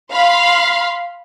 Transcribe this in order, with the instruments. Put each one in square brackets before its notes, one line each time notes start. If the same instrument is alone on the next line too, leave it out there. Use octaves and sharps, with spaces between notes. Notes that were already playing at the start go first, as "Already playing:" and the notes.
[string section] F5 B5 C6